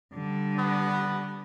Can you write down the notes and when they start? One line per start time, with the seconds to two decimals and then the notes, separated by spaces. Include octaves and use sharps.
0.14 D3 G3
0.59 B3